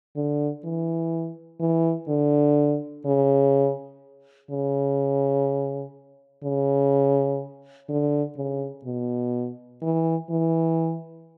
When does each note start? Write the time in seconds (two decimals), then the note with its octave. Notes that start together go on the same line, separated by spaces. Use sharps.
0.16 D3
0.64 E3
1.60 E3
2.08 D3
3.06 C#3
4.51 C#3
6.44 C#3
7.89 D3
8.36 C#3
8.85 B2
9.82 E3
10.30 E3